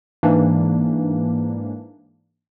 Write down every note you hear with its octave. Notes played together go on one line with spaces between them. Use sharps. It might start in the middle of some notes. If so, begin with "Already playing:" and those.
G#2 E3 A#3 D4